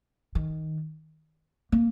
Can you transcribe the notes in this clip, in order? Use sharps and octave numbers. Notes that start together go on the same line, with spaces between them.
D#3
A#3